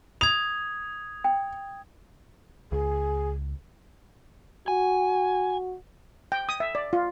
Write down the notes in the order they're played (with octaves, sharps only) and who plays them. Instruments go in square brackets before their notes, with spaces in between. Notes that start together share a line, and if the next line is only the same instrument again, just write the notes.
[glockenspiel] D#6 G#6 [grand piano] F7
[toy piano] G5
[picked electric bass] C#2 [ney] G#4
[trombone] F#4 [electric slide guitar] G#5
[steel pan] G5
D#6
E5
D5
F4